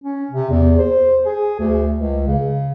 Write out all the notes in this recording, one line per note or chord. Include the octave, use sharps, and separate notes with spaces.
C#4
C3
E2
C5
G#4
D2
C#2
C#3